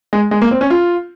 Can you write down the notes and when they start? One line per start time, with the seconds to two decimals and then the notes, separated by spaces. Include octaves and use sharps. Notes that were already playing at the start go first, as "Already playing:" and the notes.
0.13 G#3
0.31 G#3
0.42 A#3
0.51 C4
0.61 C#4
0.70 F4